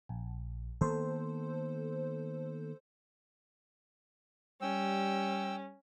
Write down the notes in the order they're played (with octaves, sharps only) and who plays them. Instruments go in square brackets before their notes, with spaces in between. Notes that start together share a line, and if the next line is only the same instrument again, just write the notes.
[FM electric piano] A#1
[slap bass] D#3 A#3 B3 [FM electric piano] A4 C5
[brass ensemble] G3 [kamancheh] C#4 [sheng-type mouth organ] G5 E6